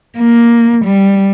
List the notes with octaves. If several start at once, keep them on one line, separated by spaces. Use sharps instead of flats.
A#3
G3